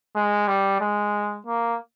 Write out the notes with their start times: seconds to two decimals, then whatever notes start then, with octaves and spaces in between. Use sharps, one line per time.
0.15 G#3
0.48 G3
0.81 G#3
1.47 A#3